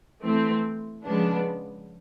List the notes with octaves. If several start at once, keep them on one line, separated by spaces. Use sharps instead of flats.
E3 A3 C4
C#3 F3 G#3 B3 D4